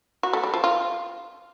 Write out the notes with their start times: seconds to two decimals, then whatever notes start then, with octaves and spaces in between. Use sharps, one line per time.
0.23 F#4
0.33 A3
0.44 G3
0.54 F3
0.64 F4